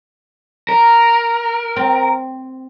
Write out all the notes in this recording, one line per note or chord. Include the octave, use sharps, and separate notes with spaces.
A#4
C4